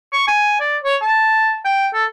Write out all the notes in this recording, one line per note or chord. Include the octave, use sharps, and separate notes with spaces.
C#6
G#5
D5
C#5
A5
G5
A4